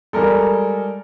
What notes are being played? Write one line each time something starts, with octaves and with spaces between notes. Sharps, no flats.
G3 G#3 A4 A#4